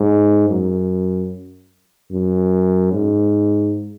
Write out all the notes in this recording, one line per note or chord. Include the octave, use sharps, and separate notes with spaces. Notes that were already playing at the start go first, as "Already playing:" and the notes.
Already playing: G#2
F#2
F#2
G#2